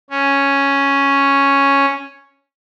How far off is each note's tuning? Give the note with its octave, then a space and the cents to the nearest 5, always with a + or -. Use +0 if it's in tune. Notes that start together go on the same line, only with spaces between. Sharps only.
C#4 +0